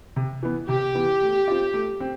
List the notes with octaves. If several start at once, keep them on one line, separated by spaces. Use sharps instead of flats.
C3
E3 B3
C3 G4
E3 B3
A3
C4 F4
A3
C4